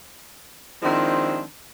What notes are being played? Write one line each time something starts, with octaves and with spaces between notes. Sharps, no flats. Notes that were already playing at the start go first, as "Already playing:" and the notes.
D#3 F3 G#3 C4 D4 E4